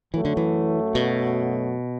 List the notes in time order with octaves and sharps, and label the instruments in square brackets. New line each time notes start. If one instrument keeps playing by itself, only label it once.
[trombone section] F#2 F#3 A3 [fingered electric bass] E3
[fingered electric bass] D3
E3
B2